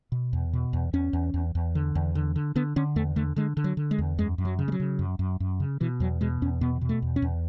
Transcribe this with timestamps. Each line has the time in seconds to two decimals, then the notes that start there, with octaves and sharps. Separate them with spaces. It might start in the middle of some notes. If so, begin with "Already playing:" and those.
0.12 B2
0.33 E2
0.53 B2
0.73 E2
0.93 E2 C#4
1.13 E2
1.34 E2
1.55 E2
1.75 D3
1.95 E2
2.15 D3
2.36 D3
2.56 D3 B3
2.76 D3 C#4
2.96 E2 A3
3.16 D3 A3
3.36 D3 G#3
3.57 D3
3.64 F#3
3.77 D3
3.91 G#3
3.98 E2
4.18 F#2 G#3
4.38 F#2
4.45 F#3
4.59 C#3
4.68 G#3
4.72 F#3
4.80 C#3
4.99 F#2
5.19 F#2
5.40 F#2
5.60 C#3
5.81 B2 E3
6.00 E2 F#3
6.21 B2 G#3
6.42 E2 C#4
6.61 B2 B3
6.81 B2
6.89 A3
7.02 E2
7.16 C#4
7.22 E2